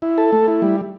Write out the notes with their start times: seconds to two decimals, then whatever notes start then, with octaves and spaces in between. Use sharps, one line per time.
0.02 E4
0.18 A4
0.33 A3
0.48 E4
0.62 G3